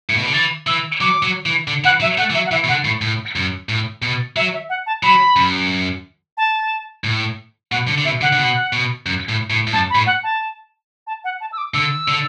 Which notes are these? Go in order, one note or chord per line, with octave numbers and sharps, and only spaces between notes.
A2
B2
D3
E3 A6
E3 E6
F#3 D6
F#3
E3
D3
E3 F#5
F#3 E5
A3 F#5
E3
F#3 E5
F#5
E3 E5
B2
D3 F#5
A2
A2
F#2
A2
B2
F#3 E5
E5
F#5
A5
F#3 B5
F#2
A5
A2
B2 F#5
D3
D3
B2 E5
D3 F#5
D3
B2
B2
F#2
A2
A2
A2
F#2 A5
B5
A2
F#5
A5
A5
F#5
A5
E6
D6
D3 E6
D3